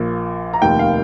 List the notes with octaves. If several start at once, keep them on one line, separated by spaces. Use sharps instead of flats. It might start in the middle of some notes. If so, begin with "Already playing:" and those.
Already playing: A#1 A#2
A#5
F1 D#2 D#3 G5
F5